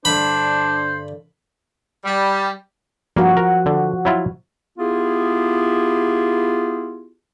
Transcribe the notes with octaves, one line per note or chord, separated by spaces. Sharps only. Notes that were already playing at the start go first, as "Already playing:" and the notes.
G2 D3 D4 C5 B5
G3
G2 F3 A#3 F#4
A#4
D3
F#3 E4 F4
B3 E4 F4 G4 G#4